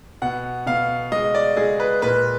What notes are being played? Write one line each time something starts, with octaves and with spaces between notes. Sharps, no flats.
B2 F#5
B2 F5
G#3 D#5
D5
G#3 G#4
B4
A#2 B4